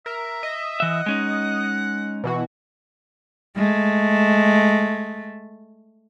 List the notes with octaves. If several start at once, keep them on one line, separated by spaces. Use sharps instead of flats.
A#4 E5
D#5
E3 E5 F#5
G#3 C#4 D#4
B2 E3 F#4
G#3 A3